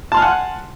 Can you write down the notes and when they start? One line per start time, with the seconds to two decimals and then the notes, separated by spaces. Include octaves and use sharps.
0.12 A5
0.14 C6
0.17 F6
0.20 G#5
0.22 F#5